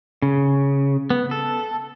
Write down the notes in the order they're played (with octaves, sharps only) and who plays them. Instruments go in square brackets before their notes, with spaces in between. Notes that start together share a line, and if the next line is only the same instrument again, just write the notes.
[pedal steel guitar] C#3
B3
A4